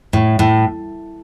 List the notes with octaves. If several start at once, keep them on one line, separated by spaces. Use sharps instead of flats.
A2
A2